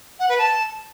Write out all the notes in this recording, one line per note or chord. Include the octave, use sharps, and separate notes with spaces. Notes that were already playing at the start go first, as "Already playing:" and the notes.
F#5
B4
A5